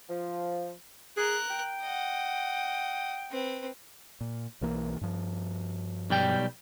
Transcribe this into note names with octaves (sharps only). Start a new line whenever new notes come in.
F3
G#4 A#4 F#6
G5
D#5 F#5
C4 B4
A#2
B1 E3 A#3
G2 F3
B1 G3 G5